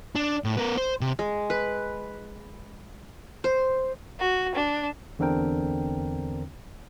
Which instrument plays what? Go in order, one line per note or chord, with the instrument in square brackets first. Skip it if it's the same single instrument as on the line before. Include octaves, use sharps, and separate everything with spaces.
[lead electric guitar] D4
A2
B3 A#4
C5
C3
[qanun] G#3
B4
C5
[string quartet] F#4
D4
[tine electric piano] E2 D3 C4 D4 A#4 G5